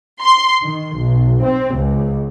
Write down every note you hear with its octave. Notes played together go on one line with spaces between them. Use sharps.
C6
D#3
B1
C4
C#2